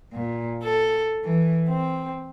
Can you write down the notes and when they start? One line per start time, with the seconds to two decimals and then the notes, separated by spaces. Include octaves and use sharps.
0.12 A#2
0.63 A4
1.23 E3
1.69 C4